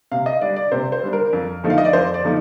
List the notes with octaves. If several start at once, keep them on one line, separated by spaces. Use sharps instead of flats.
C3 F5
D#5
G3 D4 D5
D5
C3 C5
C5
G3 D4
A#4
F2
D3 F3 A3 D#4
F5
D#5
D5
F2 C5
D5
D3 F3 A3 D#4